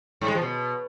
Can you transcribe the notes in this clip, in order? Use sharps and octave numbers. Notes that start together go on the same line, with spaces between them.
G#2
G#3
F3
B2